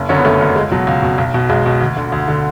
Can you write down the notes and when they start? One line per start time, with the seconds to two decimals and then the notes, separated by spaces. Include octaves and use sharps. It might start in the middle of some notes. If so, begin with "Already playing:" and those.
Already playing: F#1
0.09 F#2 D3 C#4
0.18 B3
0.25 F#1 A3
0.41 F#2 D3
0.56 C#2 G#3
0.71 B2 F#3
0.87 C#2
1.03 B2
1.18 B1
1.34 B2
1.50 B1 G#3
1.66 B2
1.81 D2
1.97 D3
2.12 D2
2.28 D3